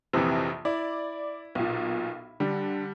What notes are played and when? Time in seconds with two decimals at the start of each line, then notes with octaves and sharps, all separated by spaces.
0.13 A#1 F2 C3 E3
0.65 E4 D5
1.55 B1 A#2
2.40 D3 G3